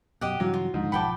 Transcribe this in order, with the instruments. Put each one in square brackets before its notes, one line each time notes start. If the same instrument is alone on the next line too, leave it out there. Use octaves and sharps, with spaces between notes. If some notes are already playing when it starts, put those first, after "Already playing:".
[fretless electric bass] F#2 B2 [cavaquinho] G4 D#5 F#5
[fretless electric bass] G2 C#3 E3 [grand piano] F#3 [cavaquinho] F5
[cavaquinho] F4
[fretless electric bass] D#2 D3 F3 [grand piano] G#2
[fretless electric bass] B1 F3 [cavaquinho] F#5 G5 A5 [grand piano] B5 D6